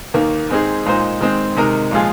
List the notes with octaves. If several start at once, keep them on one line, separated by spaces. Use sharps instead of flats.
D#2 D#3 A#3
G#2 G#3 C4 D#4 G#4
A#2 G#3 D#4 C5
D#3 G#3 C4
C3 D#3 G#3 D#4 A#4
A#2 F3 G#3 F4 G#4